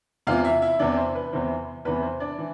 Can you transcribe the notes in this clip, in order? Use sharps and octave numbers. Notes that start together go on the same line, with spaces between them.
E2 C3 E3 F4 F5
E4 E5
E4 E5
E2 C3 E3 D4 D5
C5
B4
E2 C3 E3 C5
E2 C3 E3 B4
C5
D4 D5
E3